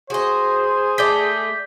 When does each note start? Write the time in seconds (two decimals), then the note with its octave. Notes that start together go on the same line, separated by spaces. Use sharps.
0.10 F#4 G#4 C5 D#5
0.98 G#3 A3 D5 G6 B6